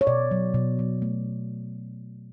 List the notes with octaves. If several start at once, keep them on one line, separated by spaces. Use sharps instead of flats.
C#5
B2 D5
F#3
B2
F#3
A3